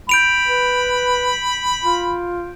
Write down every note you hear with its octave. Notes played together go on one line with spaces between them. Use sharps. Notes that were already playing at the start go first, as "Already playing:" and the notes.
B5 G6 D7 F7
B4
F4